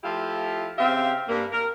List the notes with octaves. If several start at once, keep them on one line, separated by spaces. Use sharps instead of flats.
F3 A3 E4 F4 G4 F5
C#3 C4 G4 E5 F5
G2 A#3
A#4